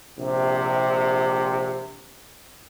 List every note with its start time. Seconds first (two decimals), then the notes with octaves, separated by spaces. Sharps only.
0.18 A#1 C3